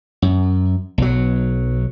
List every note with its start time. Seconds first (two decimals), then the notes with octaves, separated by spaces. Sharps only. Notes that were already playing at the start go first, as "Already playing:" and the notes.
0.22 F#2
0.98 B1 F#3